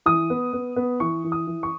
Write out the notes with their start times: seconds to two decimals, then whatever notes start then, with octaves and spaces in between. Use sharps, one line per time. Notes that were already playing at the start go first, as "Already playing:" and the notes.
0.06 E3 D#6
0.30 B3
0.53 B3
0.76 B3
1.00 E3 C#6
1.24 E3
1.32 D#6
1.47 E3
1.63 C#6